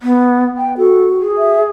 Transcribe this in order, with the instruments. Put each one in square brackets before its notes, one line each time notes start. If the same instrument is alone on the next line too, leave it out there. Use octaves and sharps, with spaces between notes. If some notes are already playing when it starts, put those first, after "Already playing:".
[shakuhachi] B3
G5
[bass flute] F#4 [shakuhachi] A4
[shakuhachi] G#4
[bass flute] E5